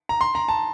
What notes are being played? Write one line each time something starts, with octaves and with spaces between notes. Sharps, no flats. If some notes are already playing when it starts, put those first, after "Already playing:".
A#5
C6
A#5
A5